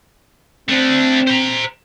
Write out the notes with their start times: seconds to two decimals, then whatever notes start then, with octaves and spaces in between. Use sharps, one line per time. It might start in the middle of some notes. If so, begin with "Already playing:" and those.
0.69 A3 C4 D4
1.27 C5 A#5